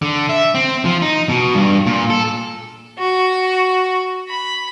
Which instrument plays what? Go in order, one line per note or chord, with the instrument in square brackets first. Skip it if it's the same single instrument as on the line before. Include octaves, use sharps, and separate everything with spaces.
[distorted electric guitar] D3
E5
C4
F3
D#4
B2
G2
A#2
A4
[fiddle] F#4
B5